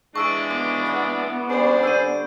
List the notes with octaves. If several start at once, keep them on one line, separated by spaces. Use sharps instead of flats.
E3 G#3 D4 A5 C#6 E6 D7
B3 C6 D6
D5 F#5 C6
G3 C#4 D4 G#4 C5
D3 E6 G6 D#7